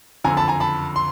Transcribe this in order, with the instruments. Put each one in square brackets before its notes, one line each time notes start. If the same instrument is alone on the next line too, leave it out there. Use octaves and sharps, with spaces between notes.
[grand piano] F#1 F2 D3 G#5 A#5
A5 B5
G#5 A#5
A5 B5
C6